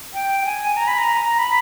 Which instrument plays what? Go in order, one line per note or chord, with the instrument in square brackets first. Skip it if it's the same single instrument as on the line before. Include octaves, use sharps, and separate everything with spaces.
[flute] G5
G5
G#5
A#5
B5
A#5
B5